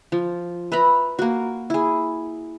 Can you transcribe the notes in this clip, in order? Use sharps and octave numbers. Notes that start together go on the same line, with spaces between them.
F3
B4 E5 A#5 B5
A#3 F#4
E4 G#4